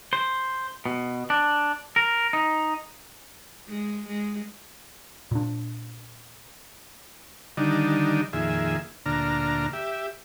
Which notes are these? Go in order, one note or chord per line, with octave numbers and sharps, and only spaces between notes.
C5
B2
D4
A#4
D#4
G#3
G#3
A#2 D4
D3 D#3 G3 D4 D#4
F2 A#2 D#3 G#4 E5
D2 A#2 D4 A#5 F6
G4 E5